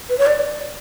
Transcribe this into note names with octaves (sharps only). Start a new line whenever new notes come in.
B4
C#5
D5